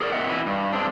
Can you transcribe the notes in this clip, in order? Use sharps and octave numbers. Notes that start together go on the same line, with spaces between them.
G#4 A#4 C#5 D5
A#2 G3 C4 D#5 E5 F#5
E4 F#4 B4
G2
G#3 C4 D4